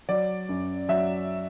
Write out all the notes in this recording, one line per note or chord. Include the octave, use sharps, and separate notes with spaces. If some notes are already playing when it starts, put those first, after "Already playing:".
F#3 D5
F#2
F#3 E5